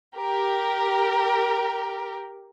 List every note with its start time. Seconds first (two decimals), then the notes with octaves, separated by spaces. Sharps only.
0.15 G4 A#4